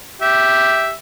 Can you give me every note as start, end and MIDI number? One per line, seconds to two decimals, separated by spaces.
0.22 0.92 67
0.22 0.94 76